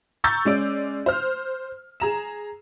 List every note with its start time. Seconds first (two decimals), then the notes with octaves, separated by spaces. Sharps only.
0.24 A#5 C#6 E6 G6 A6
0.45 G#3 C#4 D5 D7
1.06 C5 F6
2.00 G#4 A#5 E7